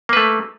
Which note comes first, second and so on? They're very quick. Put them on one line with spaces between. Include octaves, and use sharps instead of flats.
A#3 B4 A3